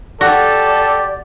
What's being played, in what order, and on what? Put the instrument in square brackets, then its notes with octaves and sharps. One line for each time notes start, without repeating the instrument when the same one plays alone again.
[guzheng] F#4 [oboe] G4 [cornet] A4 [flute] D5